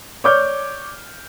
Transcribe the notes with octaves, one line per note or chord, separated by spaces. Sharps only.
C#5 D5 D6 F6 G6